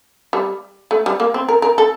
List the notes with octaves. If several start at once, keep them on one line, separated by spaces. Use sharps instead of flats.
G3
A3
G3
A#3
C4
A#4
A#4
A4